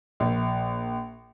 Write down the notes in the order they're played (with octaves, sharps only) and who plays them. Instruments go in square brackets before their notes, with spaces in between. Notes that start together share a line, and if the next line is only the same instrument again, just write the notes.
[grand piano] A#1